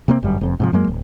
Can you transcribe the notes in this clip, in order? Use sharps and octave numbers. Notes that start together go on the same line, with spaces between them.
C3 A#3 C4
G1 F#2 G3
F1 F2
G#2 C3 F3
F#2 F#3 G#3 A#3
D1